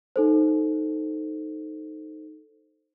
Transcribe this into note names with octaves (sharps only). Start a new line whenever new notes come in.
D#4 A4 C5